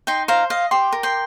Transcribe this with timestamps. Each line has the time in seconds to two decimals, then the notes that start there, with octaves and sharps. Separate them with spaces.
0.07 D#4 G5 C6
0.28 C5 F5 A#5
0.50 D#5 F5
0.71 G4 G5 C6
0.93 A#4
1.03 G5 C6